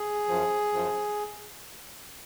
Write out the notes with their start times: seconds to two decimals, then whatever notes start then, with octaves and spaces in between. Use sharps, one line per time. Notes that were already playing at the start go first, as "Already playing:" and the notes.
Already playing: G#4
0.29 F#2 F3
0.73 F#2 F3